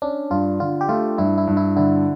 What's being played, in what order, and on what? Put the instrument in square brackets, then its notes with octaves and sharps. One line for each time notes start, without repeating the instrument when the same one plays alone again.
[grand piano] C#4 [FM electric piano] D4
[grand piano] G2 [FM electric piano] F4
[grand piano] D3 [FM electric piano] F4
[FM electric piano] G4
[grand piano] A3 [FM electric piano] F4
[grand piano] G2 [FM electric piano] E4
[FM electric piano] E4
[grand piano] G2
[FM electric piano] E4
[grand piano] D3 [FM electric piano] E4